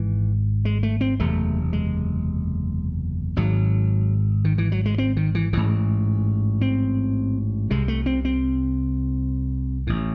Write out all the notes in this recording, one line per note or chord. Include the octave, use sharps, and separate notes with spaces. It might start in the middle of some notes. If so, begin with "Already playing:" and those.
Already playing: G#1 G#2 E3
G#3
A3
C4
F#1 E2 C3 A3
G#3
G#1 G#2 F#3
D#3
E3
F#3
G#3
C4
D#3
E3
A1 G#2 E3
C4
C2 C3 G#3
A3
C4
C4
A1 A2